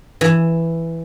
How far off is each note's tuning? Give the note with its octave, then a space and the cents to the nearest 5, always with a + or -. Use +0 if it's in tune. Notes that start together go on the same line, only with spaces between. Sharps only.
E3 +5